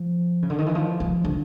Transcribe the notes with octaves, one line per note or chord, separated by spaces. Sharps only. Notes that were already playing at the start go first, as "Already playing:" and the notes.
Already playing: F3
C#3
D3
D#3
E3
F3
F3
D3